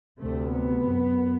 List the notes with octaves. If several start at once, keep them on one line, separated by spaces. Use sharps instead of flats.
D2 C3 A3
B3
F#2